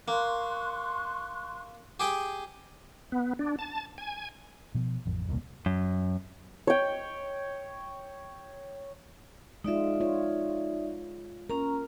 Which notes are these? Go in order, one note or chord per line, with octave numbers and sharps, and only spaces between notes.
A#3 C6 C#6 F#6
G4 G#4 G5
B3
D4
A5
G#5
B2 F3
A1 F2
D#1 C2 C#3 A#3
F#2
C#5 G5
G#3 D#4 F4 D5 E5
F4 C#5
C#4 A#4 A#5